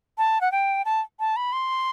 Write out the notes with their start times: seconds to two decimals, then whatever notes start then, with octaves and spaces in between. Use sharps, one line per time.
0.18 A5
0.41 F#5
0.52 G5
0.85 A5
1.20 A5
1.36 B5
1.52 C6